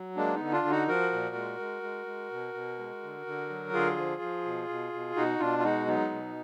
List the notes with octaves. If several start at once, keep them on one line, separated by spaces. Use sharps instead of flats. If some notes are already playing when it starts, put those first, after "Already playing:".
Already playing: F#3
G#3 A#3 D4
B3 D#4
D3
D4 F4
D3
D#4 F#4
F3 F#4 A#4
A#2
G#3
G#3
G#3
G#3
B2
B2
G#3
D3
D3
F#3
D3 F4 G#4
F3
F3
B2
B2
B2
B2 D#4 F#4
B2 D4 F4
F4
G#3 D#4 F#4
F#3 B3 D#4
B2